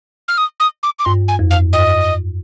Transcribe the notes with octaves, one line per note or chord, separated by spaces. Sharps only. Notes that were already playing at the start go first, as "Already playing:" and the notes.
F6
D#6
D#6
D6
D6
G2 C6
G#5
F2
F5
G2 D#5